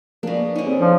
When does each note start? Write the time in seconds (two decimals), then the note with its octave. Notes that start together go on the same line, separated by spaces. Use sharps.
0.23 B2 F3 A#3 D4 G#4
0.55 D3 C#4 D#4
0.67 C4 G#4
0.81 F3 D4